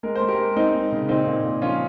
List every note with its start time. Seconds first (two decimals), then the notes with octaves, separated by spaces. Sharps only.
0.03 G#3 A#4
0.15 C5
0.22 G#3
0.28 G4 A#4
0.38 G#3
0.56 G#3 C4 D#4
0.74 G#3
0.92 C#3
1.09 A#2 C4 D#4
1.27 A#2
1.44 A#2
1.62 F3 C#4 F4